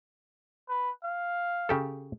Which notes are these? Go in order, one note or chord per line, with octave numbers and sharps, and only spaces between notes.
B4
F5
C#3 G4 A4